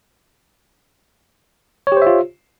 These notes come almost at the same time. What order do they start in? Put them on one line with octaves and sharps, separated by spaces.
C#5 G4 C5 E5 F4